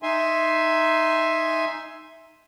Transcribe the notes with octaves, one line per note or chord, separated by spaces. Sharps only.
D#4 E5 G#5 C6